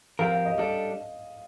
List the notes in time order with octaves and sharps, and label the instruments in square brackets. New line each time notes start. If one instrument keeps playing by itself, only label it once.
[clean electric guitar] F3 C4 G4 A#4 [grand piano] F5
[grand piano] F5
D#5
[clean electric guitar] G3 D4 A4 [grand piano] D#5